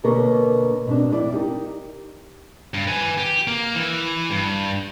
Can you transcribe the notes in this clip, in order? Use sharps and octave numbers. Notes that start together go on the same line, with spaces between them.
B2 D3 A#3 A#4 B4 C#5
B2 C4 D4
F2 E4 D5
D#4 G4 A#4
G2
B4 G#5
G4
A#3
E3
G2